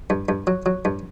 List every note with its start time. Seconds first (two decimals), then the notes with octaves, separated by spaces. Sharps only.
0.10 G2
0.29 G2
0.47 F#3
0.66 F#3
0.85 G2